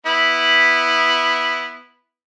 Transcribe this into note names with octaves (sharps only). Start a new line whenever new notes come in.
B3 E4 B5